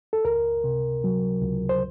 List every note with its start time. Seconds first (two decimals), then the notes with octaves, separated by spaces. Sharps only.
0.13 A4
0.25 C#2 A#4
0.64 C3
1.04 F#3
1.42 C#2
1.69 C5